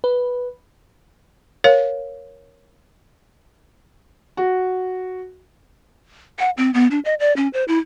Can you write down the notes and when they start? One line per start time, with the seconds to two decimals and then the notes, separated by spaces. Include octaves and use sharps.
0.04 B4
1.64 A#4 C#5 F5
4.37 F#4
6.39 F#5
6.57 C4
6.74 B3
6.91 D4
7.05 D#5
7.20 D5
7.36 C#4
7.53 C5
7.68 E4